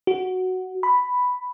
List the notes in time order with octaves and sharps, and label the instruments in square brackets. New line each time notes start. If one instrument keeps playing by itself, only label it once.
[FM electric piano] F#4
B5